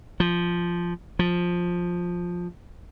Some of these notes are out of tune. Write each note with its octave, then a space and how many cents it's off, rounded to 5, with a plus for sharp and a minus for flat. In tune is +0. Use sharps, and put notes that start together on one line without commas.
F3 -5
F3 +10